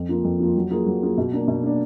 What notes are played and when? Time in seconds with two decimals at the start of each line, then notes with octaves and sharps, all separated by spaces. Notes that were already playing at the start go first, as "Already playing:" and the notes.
Already playing: F2
0.09 F3 A#3 F4
0.24 F2
0.40 F3 A#3 F4
0.56 F#3
0.71 A#3 F4 G#4
0.86 F#3
1.02 A#3 F4 G#4
1.18 B2
1.33 A#3 D4
1.48 B2
1.63 A#3 D4